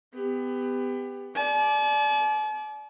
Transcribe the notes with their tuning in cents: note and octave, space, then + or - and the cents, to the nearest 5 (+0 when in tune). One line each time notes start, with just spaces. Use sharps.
B3 +25 G4 +25
D5 +0 A5 -45